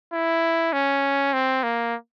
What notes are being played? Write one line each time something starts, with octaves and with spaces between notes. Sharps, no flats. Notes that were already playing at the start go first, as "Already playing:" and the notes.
E4
C#4
C4
A#3